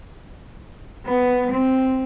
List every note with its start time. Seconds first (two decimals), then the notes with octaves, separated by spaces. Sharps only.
1.05 B3
1.50 C4